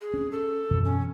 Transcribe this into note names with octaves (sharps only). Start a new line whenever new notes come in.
G#4
C#4
A4
F#2 B2 E3
C#4